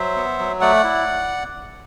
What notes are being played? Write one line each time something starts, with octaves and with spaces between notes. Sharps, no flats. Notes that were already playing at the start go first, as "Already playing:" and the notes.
Already playing: F#3 C5 E5
B3
F#3
A3 D5 F#5
E4